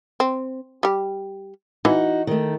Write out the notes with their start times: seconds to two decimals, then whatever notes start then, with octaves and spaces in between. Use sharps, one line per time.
0.20 C4
0.83 G3 G4
1.85 E3 D#4 F#4
2.27 D#3 A3